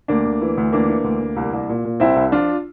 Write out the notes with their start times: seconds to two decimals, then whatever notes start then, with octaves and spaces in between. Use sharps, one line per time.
0.08 D2 A#3 D4
0.26 D2
0.41 E3
0.57 D2
0.72 E3 A#3 D4
0.89 E3
1.04 D2
1.21 D2
1.36 C2
1.53 C2
1.69 A#2
1.85 A#2
2.00 C2 C4 E4
2.16 C2
2.32 F3 D4 F4